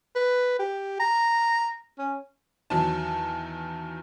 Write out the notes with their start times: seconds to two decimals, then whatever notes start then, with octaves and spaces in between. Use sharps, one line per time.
0.15 B4
0.59 G4
1.00 A#5
1.98 C#4
2.70 E2 B2 D#3 F#3 A5